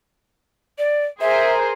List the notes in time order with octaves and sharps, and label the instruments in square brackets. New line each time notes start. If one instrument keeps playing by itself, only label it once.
[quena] D5
[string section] G#4 A#4 C5 [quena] E5